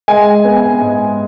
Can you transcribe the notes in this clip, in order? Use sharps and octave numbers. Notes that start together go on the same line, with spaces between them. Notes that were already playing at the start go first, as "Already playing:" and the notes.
G#3 G#5
B3
G#5
G#2